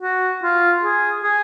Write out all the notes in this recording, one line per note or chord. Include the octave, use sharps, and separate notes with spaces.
F#4
F4
G#4
G#4